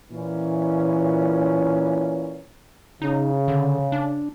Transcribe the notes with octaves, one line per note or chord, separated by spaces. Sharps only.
A#2 E3 C#4
C#3 D#4
D3
D4